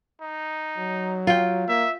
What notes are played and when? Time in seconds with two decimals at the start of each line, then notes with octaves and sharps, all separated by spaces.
0.22 D#4
0.78 F#3
1.27 F4 G5
1.68 A#3 E5